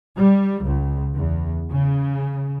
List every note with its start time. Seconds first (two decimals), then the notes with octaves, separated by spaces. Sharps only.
0.17 G3
0.64 C#2
1.15 E2
1.69 C#3